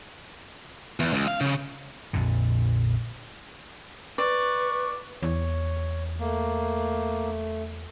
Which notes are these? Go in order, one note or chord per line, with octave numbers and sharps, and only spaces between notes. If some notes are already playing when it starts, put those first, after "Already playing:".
E2
C#2
F5
C#3
A#1 F2 A#2 D3
B4 D5 C#6
E2 C#5
A3 A#3